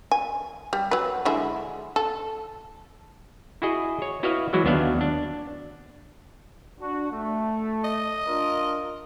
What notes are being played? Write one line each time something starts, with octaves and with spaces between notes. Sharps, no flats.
G#5
G3
F#3 B4
D3 G#3 E4
A4
E4 F#4 G#4 D#5
C#5
E4 F#4 B4 C#5 D#5 F5
E3 F#3 G#3 E4 F#4
D#2 F#3 B3 D4 E5 F5
D4
D4 F#4
A3
D#5
D4 F4 A#4